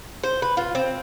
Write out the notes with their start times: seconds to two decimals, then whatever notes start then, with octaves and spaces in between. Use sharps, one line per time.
0.24 C5
0.42 B4
0.57 F4
0.75 C4